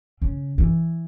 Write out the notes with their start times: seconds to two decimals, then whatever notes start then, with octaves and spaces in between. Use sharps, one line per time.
0.22 C#3
0.58 E3